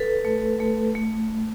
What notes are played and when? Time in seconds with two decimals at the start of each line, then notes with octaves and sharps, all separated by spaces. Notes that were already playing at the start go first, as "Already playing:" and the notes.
Already playing: A4 B4
0.25 A3
0.60 A3
0.95 A3